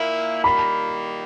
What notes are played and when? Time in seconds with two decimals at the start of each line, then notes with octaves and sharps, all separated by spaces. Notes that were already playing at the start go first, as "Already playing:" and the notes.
Already playing: A#2 A#3 E4
0.44 D#3 G3 A#3 B5